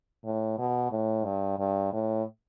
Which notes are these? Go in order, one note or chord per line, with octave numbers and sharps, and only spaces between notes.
A2
B2
A2
G2
G2
A2